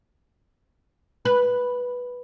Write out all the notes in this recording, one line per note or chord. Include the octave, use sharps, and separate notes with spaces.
B4